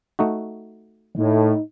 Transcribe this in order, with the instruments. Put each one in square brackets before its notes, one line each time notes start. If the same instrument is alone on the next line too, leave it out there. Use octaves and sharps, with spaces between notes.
[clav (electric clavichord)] A3 D#4 F#4
[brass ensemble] A2 [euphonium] D#4